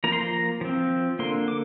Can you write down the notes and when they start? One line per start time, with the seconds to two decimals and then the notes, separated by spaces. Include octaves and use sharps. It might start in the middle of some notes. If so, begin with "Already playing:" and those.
0.04 F3 A#3 A#5
0.12 C6
0.21 A#5
0.61 F3 C4
1.19 D3 A#3 C6
1.48 D6